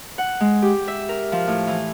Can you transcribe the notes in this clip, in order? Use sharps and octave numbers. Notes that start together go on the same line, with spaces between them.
F#5
G#3
G4
E5
A#4
F3
A2
E3